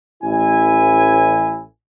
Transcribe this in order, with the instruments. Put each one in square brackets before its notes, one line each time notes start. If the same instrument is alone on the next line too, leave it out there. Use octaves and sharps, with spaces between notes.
[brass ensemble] A1 E4 G#5